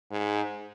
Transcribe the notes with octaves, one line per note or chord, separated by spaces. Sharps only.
G#2